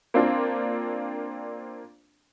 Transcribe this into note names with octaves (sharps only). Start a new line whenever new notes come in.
A#3 C4 D4 F4